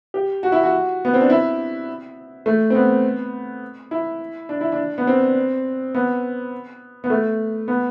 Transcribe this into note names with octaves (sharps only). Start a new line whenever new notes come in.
G4
F#4
E4
F#4
B3
C4
D4
E4
A3
C4
B3
E4
D4
E4
D4
B3
C4
B3
B3
A3
B3